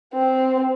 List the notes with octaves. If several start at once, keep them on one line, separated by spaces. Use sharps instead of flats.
C4